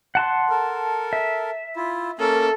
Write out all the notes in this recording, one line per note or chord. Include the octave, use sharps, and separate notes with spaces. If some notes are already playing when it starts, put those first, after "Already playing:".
F#5 A5 C6
A4 A#4
E5
E4 F4
A#3 C#4 A4 A#4